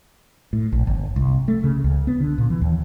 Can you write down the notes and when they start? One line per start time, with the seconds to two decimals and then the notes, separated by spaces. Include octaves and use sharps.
0.53 A2
0.73 A#1
0.87 G1
1.16 C2
1.48 A3
1.64 C#3
1.84 C#2
2.07 B3
2.20 D3
2.38 A#2
2.50 E3
2.61 D#2